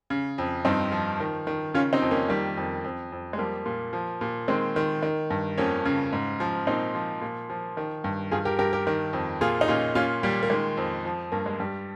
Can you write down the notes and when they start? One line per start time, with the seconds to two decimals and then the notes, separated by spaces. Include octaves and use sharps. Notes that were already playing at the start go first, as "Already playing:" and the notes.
0.10 C#3
0.38 F2
0.65 G2 C4 D#4
0.92 F3
1.20 D#3
1.47 D#3
1.74 C#3 C#4 F4
1.93 C4 D#4
2.02 F2
2.11 A#3 C#4
2.29 D#3 G3 A#3
2.57 F2
2.84 F2
3.12 F2
3.33 G#3
3.38 F3 G3 A#3
3.66 A#2
3.93 F3
4.21 A#2
4.48 D#3 G#3 C4
4.76 D#3
5.03 D#3
5.30 G2
5.58 F2 A#3 C#4
5.85 C#3
6.13 G#2
6.40 F3
6.67 A#2 C4 D#4
6.95 F3
7.21 A#2
7.50 F3
7.77 D#3
8.04 G2
8.32 G2 F4 G#4
8.45 G4 A#4
8.59 G2 G4 A#4
8.73 G4 A#4
8.87 D#3
9.13 F2
9.41 A#2 F4 G#4
9.61 D#4
9.68 A#2 C#4 F4
9.95 A#2 C#4 F4
10.23 A#2 G3 A#3
10.43 A#3
10.50 D#3 G#3
10.77 F2
11.05 F3
11.32 G2 A#3
11.46 G#3
11.60 G2 G3